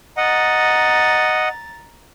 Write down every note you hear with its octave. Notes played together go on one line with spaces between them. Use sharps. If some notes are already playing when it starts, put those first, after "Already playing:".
D#5 F#5 A#5 A6